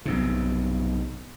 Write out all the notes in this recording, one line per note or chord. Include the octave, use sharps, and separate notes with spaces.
B1 G2 C3